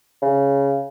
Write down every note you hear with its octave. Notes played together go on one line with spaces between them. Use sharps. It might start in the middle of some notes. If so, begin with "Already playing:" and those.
C#3